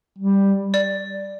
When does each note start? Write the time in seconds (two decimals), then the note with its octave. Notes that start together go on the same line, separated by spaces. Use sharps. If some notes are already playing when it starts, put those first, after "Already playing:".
0.18 G3
0.74 D5